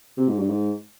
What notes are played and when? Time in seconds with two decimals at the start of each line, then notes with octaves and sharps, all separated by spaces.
0.17 C3
0.28 G#2
0.38 G2
0.49 G#2